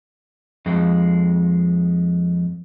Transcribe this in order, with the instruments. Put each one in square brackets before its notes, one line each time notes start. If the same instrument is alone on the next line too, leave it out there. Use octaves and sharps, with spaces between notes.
[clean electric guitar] F2 G#3